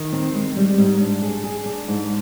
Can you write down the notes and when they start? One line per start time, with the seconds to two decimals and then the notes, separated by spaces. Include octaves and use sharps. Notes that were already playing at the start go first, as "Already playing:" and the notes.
Already playing: D#3
0.13 C4
0.35 G#3
0.57 G3
0.78 G#2
1.01 D4
1.22 G#4
1.44 G#4
1.66 D4
1.88 G#2